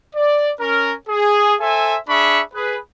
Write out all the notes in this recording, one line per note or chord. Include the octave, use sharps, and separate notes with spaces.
D5
C#4 A#4
G#4
A4 C5 E5 G#5
D4 G#4 E5 B5 C#6
G#4 B4